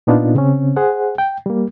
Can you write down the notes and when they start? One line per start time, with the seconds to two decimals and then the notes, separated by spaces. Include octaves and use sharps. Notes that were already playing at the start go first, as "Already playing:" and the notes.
0.07 A#2 B3 D4 D#4 F4
0.35 C#3 C4 C#4
0.76 G#4 C5 F#5
1.18 G5
1.46 G3 A#3